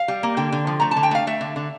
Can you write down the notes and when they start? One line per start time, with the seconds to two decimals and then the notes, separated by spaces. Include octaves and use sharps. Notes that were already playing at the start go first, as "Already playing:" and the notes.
Already playing: F5
0.08 G3
0.23 A#3
0.37 D3 G5
0.52 D3
0.67 F3
0.80 A3 A#5
0.91 A5
0.97 D3
1.03 G5
1.11 A3 F5
1.27 A3 E5
1.41 D3
1.56 D3